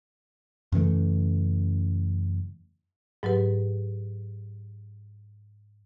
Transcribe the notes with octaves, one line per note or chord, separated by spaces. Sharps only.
F#2 C#3 E3 A3
G#2 F#3 G4 B4